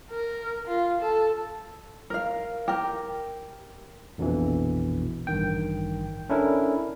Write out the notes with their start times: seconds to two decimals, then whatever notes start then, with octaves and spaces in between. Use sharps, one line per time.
0.11 A#4
0.67 F4
1.02 A4
2.10 A#4 F5
2.68 G4 A#4
4.18 A#1 F2 B2 E3
5.27 A1 G2 D#3 G5
6.30 C#4 D4 E4 A4 A#4